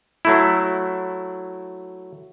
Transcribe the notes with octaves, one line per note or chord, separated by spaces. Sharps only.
F#3 A3 E4